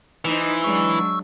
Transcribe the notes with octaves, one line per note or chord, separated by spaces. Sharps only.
E3 D#4 C5
F#3 G#3 D4 C#6 E6